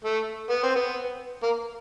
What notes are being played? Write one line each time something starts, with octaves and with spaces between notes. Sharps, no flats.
A3
B3
C4
B3
A#3